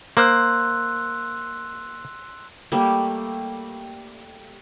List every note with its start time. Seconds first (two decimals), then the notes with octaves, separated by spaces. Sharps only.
0.17 A#3 C5 C6 E6 F#6
2.72 G3 A3 A#3